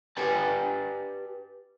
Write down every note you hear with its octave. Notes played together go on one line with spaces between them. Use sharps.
G4 B4 G#5 A5